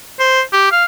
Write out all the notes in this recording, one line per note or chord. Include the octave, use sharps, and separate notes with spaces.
C5
G4
F5